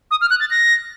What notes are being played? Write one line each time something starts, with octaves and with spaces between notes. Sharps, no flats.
D#6
F6
F#6
A6
A#6